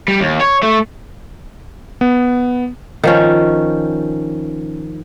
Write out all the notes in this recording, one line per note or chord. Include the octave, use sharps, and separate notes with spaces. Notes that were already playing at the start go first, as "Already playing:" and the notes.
G3
D#2
C#5
A3
B3
D#3 F3 C#4